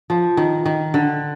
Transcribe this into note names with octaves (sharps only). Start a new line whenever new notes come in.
F3
D#3
D#3
D3